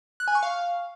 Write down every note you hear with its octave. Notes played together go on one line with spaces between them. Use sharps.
F#6
G#5
C#6
F5